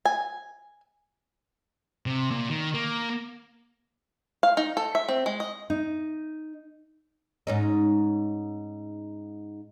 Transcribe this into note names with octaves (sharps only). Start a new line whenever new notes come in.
G#5
C3
A#2
D#3
A#3
F5
D#4
A4
E5
C4
G#3
D#5
D#4
G#2 C#4 D#4